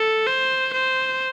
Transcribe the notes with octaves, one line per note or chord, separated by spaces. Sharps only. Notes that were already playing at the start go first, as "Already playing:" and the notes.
Already playing: A4
C5
C5